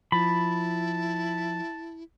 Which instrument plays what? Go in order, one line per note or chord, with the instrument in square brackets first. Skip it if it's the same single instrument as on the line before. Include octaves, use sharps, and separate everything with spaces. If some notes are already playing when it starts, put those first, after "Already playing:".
[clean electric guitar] F3 [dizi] E4 [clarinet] A5 [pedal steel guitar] B5